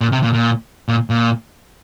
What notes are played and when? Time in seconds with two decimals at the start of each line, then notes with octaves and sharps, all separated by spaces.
0.01 A#2
0.12 C3
0.23 A#2
0.34 A#2
0.88 A#2
1.10 A#2